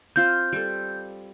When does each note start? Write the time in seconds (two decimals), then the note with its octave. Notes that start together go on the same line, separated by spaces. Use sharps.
0.16 C4 F4 C5 G6
0.53 G3 A4